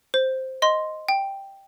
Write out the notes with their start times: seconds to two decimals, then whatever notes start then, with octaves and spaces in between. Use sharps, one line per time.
0.14 C5
0.62 D#5 C6
1.09 G5